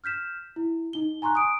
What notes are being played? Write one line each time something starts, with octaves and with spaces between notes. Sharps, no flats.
F6 G6 B6 E7
E4
D#4 G7
G#5 A#5 C6 C#6 F#6
D#6 D7